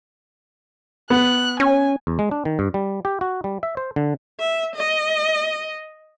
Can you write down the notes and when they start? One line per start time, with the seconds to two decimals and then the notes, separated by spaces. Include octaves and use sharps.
1.10 B3 F#6
1.60 C#4 G#5
2.07 E2
2.19 G#3
2.31 D4
2.45 D#3
2.59 G2
2.74 G3
3.05 G4
3.21 F#4
3.44 G3
3.63 E5
3.77 C5
3.96 D3
4.40 E5
4.76 D#5